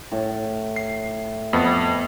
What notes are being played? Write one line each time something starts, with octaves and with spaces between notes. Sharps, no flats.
A2
C7
F2 B3